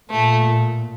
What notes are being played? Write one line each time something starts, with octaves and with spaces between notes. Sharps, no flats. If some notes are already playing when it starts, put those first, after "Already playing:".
A#2 A3